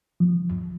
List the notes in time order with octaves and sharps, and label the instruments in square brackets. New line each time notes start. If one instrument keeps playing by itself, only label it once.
[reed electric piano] F3